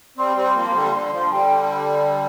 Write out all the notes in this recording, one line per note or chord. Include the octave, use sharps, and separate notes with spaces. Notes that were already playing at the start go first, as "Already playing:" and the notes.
G3 C4 C6
G3 C4
C6
F3 A#3
F3
D3 G3 C6
D3
F3
D3 G3 G5